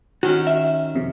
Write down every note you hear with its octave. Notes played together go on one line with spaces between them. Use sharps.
D#3 C#4 F#4
E5
F2 C3